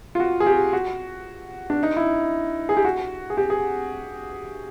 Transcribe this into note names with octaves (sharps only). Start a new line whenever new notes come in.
F4
F#4
G#4
G4
F#4
D4
D#4
E4
G#4
G4
F#4
G#4
G4
G#4